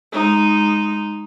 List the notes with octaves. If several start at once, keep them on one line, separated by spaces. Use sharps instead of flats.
G#3 D#4